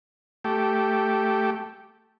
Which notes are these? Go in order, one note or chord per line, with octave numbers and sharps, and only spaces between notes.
A3 G4